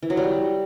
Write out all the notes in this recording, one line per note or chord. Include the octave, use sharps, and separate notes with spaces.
E3
F#3
G3